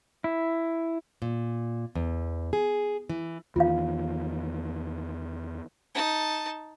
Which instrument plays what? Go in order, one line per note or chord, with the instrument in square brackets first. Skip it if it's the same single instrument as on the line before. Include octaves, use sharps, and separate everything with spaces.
[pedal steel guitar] E4
[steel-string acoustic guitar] A#2
E2
G#4
E3
[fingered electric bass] E2 D#3 [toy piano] F4 F5
[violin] D#4 A5